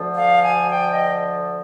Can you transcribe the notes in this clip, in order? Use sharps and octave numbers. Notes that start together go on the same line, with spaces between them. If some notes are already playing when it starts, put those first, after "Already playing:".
Already playing: D2 D3 F3
F5
G#5
G5
D#5